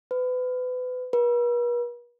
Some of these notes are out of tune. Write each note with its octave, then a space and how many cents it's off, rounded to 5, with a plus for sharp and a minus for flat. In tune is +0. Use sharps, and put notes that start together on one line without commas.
B4 +30
B4 -45